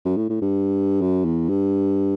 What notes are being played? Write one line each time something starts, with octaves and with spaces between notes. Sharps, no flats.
F#2
A2
A2
G2
F#2
E2
G2